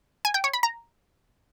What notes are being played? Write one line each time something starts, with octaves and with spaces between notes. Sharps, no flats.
G#5
G5
C#5
B5
A#5